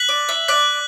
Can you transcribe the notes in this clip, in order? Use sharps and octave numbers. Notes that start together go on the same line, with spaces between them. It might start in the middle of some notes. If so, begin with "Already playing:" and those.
Already playing: F#6 B6 F#7
D5
E5
D5 F#6 B6 F#7